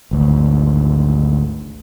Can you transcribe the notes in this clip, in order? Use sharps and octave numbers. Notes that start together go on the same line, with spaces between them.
G#1 D2